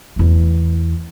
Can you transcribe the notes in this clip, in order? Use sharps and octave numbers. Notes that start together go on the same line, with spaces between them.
E2 A3